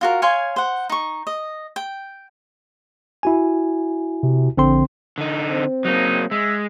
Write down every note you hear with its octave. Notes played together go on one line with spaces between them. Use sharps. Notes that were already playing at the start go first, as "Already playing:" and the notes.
F4 F#4 A#4
C#5 F5 G#5 C6
C5 F#5
D#4 C#6
D#5
G5
E4 F#4 G#5
C3
A#1 D3 C4 C6
D3 D#4
C4
F#3 A#3 D#4
G#3 E5